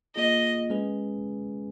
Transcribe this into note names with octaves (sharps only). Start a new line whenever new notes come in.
A#3 F4 G#4 D#5
G#3 C#4 G#4 B4